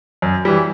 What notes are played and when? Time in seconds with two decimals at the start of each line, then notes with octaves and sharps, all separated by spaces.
0.22 F#2
0.45 E3 G3